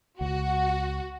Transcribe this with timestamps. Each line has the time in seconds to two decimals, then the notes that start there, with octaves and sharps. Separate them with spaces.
0.21 C#2 F#4